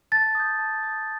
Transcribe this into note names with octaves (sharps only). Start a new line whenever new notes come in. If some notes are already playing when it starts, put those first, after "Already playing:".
A5 A6
D#6 G6
A5
D#6 G6